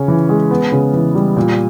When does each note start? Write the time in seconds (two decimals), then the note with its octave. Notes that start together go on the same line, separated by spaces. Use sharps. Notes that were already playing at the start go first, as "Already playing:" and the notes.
Already playing: C#3 C#4
0.08 E3
0.29 G#3
0.51 B3
0.72 C#3
0.93 E3
1.15 G3
1.37 A#2